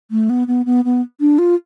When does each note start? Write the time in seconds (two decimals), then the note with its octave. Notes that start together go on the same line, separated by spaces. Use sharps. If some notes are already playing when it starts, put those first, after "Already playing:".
0.11 A3
0.30 B3
0.48 B3
0.66 B3
0.85 B3
1.20 D4
1.39 F4